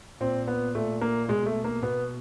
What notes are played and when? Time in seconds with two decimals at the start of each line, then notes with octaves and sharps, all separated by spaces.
0.20 A#2 C4
0.48 B3
0.75 A#2 A3
1.01 A#3
1.28 B2 G#3
1.46 A3
1.64 A#3
1.82 B2 B3